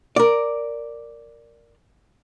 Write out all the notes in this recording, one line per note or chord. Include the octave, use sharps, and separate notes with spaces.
A#4 D5